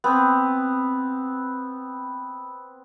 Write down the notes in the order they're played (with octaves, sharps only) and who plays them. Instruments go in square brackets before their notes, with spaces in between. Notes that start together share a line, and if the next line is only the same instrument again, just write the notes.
[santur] B3 C4